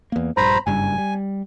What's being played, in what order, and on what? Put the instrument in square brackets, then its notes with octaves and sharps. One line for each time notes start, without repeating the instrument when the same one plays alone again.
[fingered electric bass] E2 A#3
[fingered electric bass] A#1 G2 [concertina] C5 A#5 B5
[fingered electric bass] F#1 G2 G3 [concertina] G#5
[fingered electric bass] G3